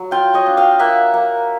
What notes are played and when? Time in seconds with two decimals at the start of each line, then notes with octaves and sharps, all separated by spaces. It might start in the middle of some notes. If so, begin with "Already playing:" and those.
Already playing: F#3
0.11 F4 F5 G5
0.34 C#5 D#5
0.46 D4
0.57 F5 G5
0.79 A#3 E5 F#5
1.14 A#3